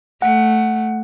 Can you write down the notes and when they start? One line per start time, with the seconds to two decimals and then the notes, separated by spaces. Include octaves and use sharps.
0.22 A3 F#5